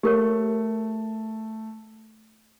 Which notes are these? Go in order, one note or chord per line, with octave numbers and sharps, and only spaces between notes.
A3 G4 A#4 C#5